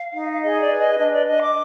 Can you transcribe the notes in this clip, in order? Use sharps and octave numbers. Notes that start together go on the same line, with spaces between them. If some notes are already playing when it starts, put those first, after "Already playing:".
Already playing: F5
D#4
F5
G#4 D#5
D5
B4
D#5
D4 D#5
D5
D4 D#5
D6